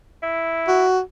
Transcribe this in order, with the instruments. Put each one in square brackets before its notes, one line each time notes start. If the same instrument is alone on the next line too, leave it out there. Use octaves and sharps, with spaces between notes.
[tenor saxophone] E4
[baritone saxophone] F#4